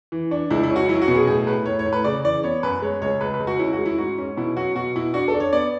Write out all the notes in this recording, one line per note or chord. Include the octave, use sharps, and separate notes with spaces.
E3
D4
C#2 E4
E4
C#4
F#4
F#3 E4
F#4
B2
G#4
A2 G#4
A2 B4
A2 C#5
C#5
A2
B4
C#3 D5
E3 D5
B3 C#5
F#2 B4
G#3 C#5
C#2 C#5
C#2 B4
B4
C#2
F#4
C#4 E4
F#4
G#3
E4
G#2 F#4
C#4
B2 E4
F#3 F#4
B2 F#4
B2 E4
D4 F#4
A4
D4
C#5
B3 D5